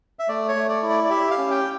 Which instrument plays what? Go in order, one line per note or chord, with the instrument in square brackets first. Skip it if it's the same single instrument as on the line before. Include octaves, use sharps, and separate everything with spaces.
[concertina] E5
A3 D5
C#5
A3
D5
E4
D5
D5
G4 E5
F5
C#4
G5